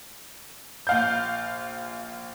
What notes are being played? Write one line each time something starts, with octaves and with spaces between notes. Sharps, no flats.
A#1 F5 G6